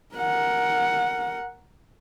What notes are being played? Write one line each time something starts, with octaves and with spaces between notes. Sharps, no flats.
A#4 F#5